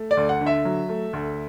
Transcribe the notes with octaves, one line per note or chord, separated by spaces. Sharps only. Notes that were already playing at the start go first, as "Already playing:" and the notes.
Already playing: A3
D5
D2
F#5
D3
E5
F#3
A3
D2